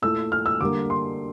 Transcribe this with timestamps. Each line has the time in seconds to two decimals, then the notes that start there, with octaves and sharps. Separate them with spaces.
0.02 A#2 A3 E4 E6
0.32 F6
0.46 E6
0.60 D3 G3 A#3 D6
0.90 C6